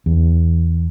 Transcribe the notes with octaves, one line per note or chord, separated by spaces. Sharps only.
E2